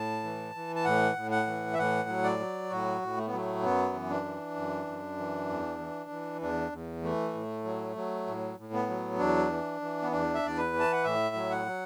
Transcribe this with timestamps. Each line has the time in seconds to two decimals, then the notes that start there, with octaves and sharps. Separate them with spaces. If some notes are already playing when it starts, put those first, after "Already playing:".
Already playing: A2 A5
0.24 E3
0.55 E3
0.76 A5
0.85 A2 F#5
1.16 A2
1.31 F#5
1.47 E3
1.73 E5
1.78 A2 F#5
2.09 F#3
2.24 D5
2.39 F#3
2.70 A2 F#4
3.02 A2
3.17 A3
3.27 B3
3.32 F#3 A3
3.63 F#2 B3
3.93 E3
4.09 D4
4.25 E3
4.56 F#2
4.87 F#2
5.18 E3
5.49 E2
5.80 E3
6.10 E3
6.41 E2 D4
6.72 E2
7.03 E3 A3
7.34 A2
7.64 F#3
7.96 F#3
8.27 A2
8.58 A2
8.73 B3
8.89 F#3
9.18 E2 D4
9.51 E3
9.81 E3
10.02 B3
10.12 E2 D4
10.35 E5
10.43 E2 D5
10.57 B4
10.73 E3
10.80 A5
10.92 F#5
11.04 A2 E5
11.35 F#3
11.51 F#5
11.66 F#3